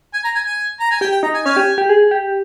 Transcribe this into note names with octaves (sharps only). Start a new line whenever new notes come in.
G#5
A#5
G#5
G#5
A#5
G#5
G4 G5
G5
D#4 A#5
G#5
C#4 F5 G#5
G4
G4
G#4
G4